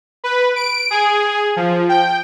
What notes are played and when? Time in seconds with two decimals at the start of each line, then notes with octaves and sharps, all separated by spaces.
0.24 B4
0.56 D7
0.91 G#4
1.56 F3
1.89 G5